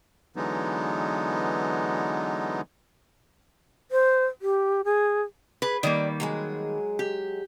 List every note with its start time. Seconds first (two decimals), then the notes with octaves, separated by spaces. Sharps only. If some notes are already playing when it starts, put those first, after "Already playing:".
0.36 D3 E3 F#3 G#3 B3 D#4
3.91 C5
4.42 G4
4.85 G#4
5.62 G#4 B4
5.83 D#3 G3 A#3 D5
6.20 F#3 G#3 G#4
6.99 G4